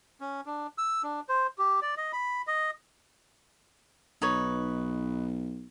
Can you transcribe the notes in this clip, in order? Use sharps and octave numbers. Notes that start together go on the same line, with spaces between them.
C#4
D4
E6
D4
C5
G4
D5
D#5
B5
D#5
B1 D#4 B4 C#5